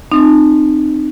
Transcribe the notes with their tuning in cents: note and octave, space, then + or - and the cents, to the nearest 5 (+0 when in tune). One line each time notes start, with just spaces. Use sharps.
C4 +0 D#4 -30